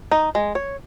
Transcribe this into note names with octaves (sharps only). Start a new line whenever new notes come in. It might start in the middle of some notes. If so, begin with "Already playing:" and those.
D#4
G#3
C#5